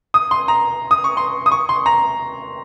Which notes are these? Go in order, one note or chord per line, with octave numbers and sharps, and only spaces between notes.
D#6
C6
A#5
D#6
C#6
C6
D#6
C#6
C6
A#5